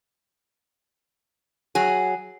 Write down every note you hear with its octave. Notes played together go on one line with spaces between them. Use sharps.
F#3 G#4